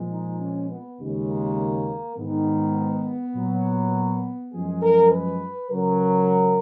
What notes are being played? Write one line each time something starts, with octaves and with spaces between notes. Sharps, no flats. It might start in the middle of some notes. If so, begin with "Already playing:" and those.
Already playing: A#2 F3 G#3
D#4
C#4
B3
D#2 C#3 G#3
A#3
G#2 D#3 G#3 B3
A#2 F#3
F#2 F3 G#3 G#4
A#4
B4
C#2 C#3 F#3 A#4